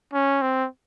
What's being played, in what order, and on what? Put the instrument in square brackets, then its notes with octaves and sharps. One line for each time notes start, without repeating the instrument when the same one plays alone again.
[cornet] C#4
C4